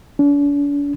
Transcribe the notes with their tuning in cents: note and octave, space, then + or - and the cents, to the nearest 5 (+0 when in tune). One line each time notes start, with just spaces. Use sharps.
D4 -45